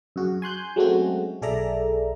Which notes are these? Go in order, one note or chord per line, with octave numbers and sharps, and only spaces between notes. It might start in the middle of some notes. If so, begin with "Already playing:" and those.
F#2 F#4 G#4
G#5 C6 F#6 G6
F#3 G#3 A3 C4 C#4 F#4
B1 G#4 A4 D5 E5 A#5